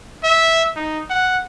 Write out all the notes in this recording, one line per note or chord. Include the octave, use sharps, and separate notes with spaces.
E5
D#4
F#5